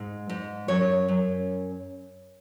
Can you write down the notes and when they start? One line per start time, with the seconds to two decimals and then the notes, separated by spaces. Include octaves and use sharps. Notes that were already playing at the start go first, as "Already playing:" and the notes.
Already playing: G#2
0.29 G#2
0.68 F#2 C#5
1.08 F#2